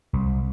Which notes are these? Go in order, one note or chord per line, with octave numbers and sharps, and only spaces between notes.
C2